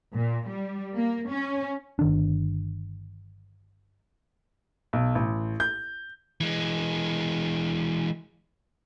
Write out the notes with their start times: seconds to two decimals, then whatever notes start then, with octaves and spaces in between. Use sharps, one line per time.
0.15 A#2
0.48 G3
0.95 A#3
1.30 C#4
1.99 G1 D#3 D4
4.93 B1
5.15 A1
5.60 G6
6.41 E3 G#3